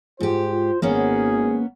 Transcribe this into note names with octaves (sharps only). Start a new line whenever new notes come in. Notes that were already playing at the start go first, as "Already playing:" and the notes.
G#2 F4 G4 C5
G#1 A#3 B3 C#4 G#4